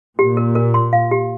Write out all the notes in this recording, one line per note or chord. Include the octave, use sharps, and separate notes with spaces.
A#2 G4
A#4
A#4
C6
F5
G4